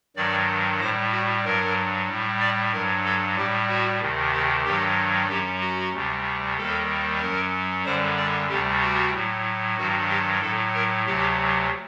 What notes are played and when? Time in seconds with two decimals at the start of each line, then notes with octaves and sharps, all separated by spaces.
0.16 G2 D#3 F#3 D5
0.80 A2 G3 C5
1.12 F#4
1.44 G2 F#3 A#4
2.08 A2 G3
2.40 D5
2.72 G2 F#3 A#4
3.05 A4
3.37 A2 G3 G4
3.68 F#4
4.01 D2 C3 D#3
4.32 G4
4.65 G2 D#3 F#3 G4
5.29 F#2 F#3 G4
5.61 F#4
5.93 D2 C3 G3
6.57 D#2 D#3 G3 A4
7.21 F#2 F#3 A#4
7.85 F#2 D3 G3 C5
8.17 D5
8.49 D2 C3 G3 G4
8.81 F#4
9.13 A2 F#3
9.77 G2 D#3 F#3 F#4
10.09 G4
10.41 A2 F#3 A4
10.74 A#4
11.06 D2 C3 F#3 G4